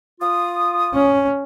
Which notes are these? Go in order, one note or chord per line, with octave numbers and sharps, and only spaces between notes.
F4 D#6
C#4